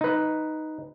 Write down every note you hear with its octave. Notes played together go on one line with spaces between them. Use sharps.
D#4 B4